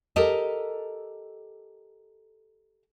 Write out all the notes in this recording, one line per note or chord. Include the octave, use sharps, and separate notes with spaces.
G4 A4 A#4 D#5